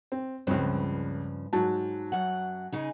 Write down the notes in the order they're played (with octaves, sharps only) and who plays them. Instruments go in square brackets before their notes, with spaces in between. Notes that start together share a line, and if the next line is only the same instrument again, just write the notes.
[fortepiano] C4
[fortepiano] C#2 C4 [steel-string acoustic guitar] G2 C#3 F3
[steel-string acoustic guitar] G#2 [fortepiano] F#3 A5
[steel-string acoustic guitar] F#2 F#5
C#3 D#4 G#4